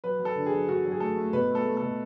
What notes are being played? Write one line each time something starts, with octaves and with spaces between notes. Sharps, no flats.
F#3 B4
F#3
A4
D3
G#4
F#3
D3 F#4
F#3
G#4
A3 A4
A3
B2 B4
A3
A4
A3
B2 A4